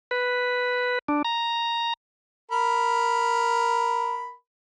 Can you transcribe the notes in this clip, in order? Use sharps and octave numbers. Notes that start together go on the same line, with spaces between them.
B4
D4
A#5
A#4 B5